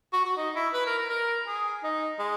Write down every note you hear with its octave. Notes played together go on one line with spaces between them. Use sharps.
F#4
F#4
D#4
E4
B4
A#4
A#4
A#4
G#4
D#4
G#3